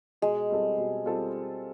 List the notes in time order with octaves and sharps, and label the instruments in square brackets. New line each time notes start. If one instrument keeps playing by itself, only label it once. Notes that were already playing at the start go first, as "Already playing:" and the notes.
[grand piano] B2 [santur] G#3
[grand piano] G3 C4 F4 A4
B2
G3 C4 F4 A4